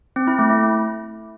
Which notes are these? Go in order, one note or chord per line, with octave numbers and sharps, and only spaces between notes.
C4
E4
A3
A3